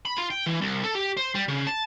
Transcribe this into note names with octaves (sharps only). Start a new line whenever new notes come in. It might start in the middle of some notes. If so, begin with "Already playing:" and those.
B5
F4
G5
E3
C2
A4
G4
C5
G3
C#3
A5